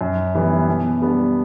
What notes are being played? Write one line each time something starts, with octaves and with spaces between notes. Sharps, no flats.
F#2
E3 G3 B3
B2
G3 B3 D4